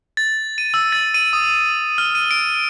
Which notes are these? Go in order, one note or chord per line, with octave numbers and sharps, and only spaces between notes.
A6
D#7
E6
A6
D#7
D#6
F6
D#7
D7